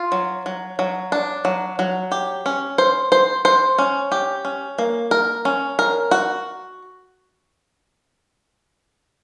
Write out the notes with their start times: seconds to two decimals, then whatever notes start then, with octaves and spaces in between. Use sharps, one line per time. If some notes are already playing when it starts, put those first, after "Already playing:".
Already playing: F4
0.12 F#3
0.46 F#3
0.79 F#3
1.12 D4
1.45 F#3
1.79 F#3
2.12 G4
2.46 C#4
2.78 C5
3.12 C5
3.45 C5
3.78 C#4
4.12 G4
4.45 C#4
4.78 A#3
5.11 A#4
5.45 C#4
5.79 A#4
6.11 F#4